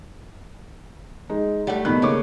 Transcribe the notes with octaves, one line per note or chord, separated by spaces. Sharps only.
G#3 D#4
G3 A3 D5 F#5
B2 D#3 B5 F#6
C#3 A#3 C#6 D6